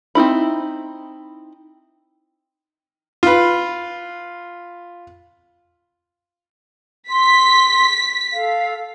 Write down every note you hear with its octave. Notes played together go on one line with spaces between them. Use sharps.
C4 D#4 E4 B5
F4 B4
C6 B6
A4 F5